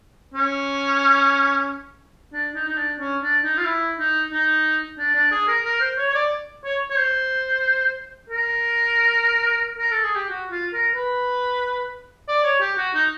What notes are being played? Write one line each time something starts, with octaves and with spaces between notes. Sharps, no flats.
C#4
D4
D#4
D#4
D4
C#4
D4
D#4
F4
E4
D#4
D#4
D4
D4
G#4
A#4
A#4
C5
C#5
C#5
D5
C#5
C#5
C5
A#4
A#4
A4
G#4
G4
F#4
F4
A#4
B4
D5
C#5
G4
F#4
D#4